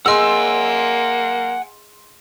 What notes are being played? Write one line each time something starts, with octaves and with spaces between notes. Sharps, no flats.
A#3 G#4 D#5 F#5 G#5 C6 E6